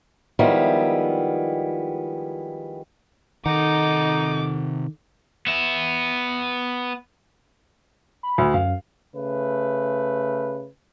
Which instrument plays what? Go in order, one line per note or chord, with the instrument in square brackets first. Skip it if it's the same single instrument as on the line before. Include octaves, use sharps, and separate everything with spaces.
[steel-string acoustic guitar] D#3 F3 G3 G#3 B3 E4
[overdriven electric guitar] C3 F#5 [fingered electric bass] D#3 [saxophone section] D#4 [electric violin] A4 D6
[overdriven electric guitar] B3 E5
[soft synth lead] B5
[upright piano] D2
[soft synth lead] F#2 [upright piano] F5
[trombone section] C#3 A3 B4